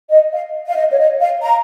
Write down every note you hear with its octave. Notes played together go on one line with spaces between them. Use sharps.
D#5
F5
F5
D#5
C#5
D#5
F5
A#5